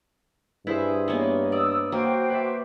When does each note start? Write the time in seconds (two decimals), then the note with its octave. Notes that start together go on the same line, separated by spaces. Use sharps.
0.67 G2 E4 G#4 B4 C5 E5
1.08 A#3 B3 D#4 C#5
1.52 D5 D#6 E6
1.92 A#3 F#4 C5 G5
2.29 B4 D5 E5